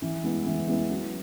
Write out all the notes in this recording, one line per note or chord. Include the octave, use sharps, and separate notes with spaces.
E3
G#3 B3 E4 B4
E3
G#3 B3 E4 B4
F#3